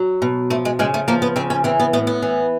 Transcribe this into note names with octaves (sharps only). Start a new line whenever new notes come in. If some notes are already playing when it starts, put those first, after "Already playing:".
Already playing: F#3
B2
F3 A3
G#3
C#3 G#3
A3
F3 A#3
B3
C#3 C4
C#4
E3 C4
B3
A2 B3
B3
E3